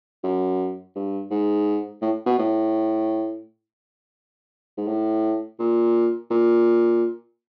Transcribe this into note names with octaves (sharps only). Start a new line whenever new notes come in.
F#2
G2
G#2
A2
B2
A2
G#2
A2
A#2
A#2